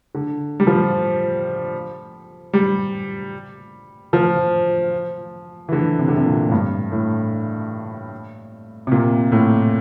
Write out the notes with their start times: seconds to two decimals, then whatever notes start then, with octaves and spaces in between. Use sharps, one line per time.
0.15 D3
0.60 G3
0.67 F3
2.53 G3
4.13 F3
5.69 E3
5.72 D3
5.99 C3
6.08 D3
6.17 C3
6.25 A#2
6.48 A2
6.52 G2
6.92 A2
8.87 C3
8.92 A#2
9.32 A2